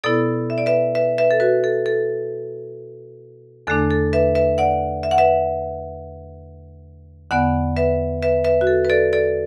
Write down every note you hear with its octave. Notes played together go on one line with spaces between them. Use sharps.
B2 B3 E4 A4 D5
E5
D5
B4 E5
B4 E5
B4 E5
A4
F#4 B4
A4
A4
E2 D3 A3 D4 A4
A4
B4 E5
B4 E5
D5 F#5
E5
F#5
B4 E5
E2 D3 B3 D5 F#5
B4 E5
B4 E5
B4 E5
F#4
A4
B4
A4 D5
A4 D5